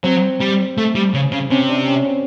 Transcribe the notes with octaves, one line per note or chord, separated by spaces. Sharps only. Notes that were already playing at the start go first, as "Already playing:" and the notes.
F#3 C4
G3
A3
G3
C#3
C#3
C3 C#4
D4
C#4
C4